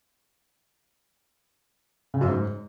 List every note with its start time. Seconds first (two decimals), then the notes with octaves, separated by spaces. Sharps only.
2.14 C#3
2.21 F#2
2.28 G#2